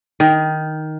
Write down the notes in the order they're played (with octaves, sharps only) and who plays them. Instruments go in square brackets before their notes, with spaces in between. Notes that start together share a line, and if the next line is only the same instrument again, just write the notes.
[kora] D#3